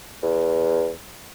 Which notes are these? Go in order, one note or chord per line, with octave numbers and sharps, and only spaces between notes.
E2